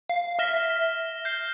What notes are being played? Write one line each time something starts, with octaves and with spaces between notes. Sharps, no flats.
F5
E5 F6 A#6 E7 G7
G6 C7 G7